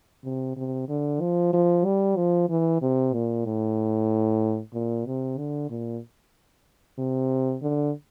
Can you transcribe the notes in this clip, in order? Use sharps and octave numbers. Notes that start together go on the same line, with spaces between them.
C3
C3
D3
F3
F3
G3
F3
E3
C3
A#2
A2
A#2
C3
D3
A#2
C3
D3